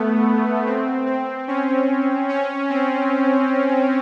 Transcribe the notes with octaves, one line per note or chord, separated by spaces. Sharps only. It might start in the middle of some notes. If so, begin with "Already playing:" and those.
Already playing: A3 B3
C4
C4
C#4
C#4
C4